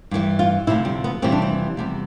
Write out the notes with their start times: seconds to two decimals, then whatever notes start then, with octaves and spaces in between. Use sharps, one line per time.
0.11 G2 E3 G3
0.39 F4
0.67 D2 C3 F3 E4
0.85 G3
1.04 B3
1.22 F2 C3 E3 G3 C4
1.32 D4
1.42 C4
1.77 E2 C3 G3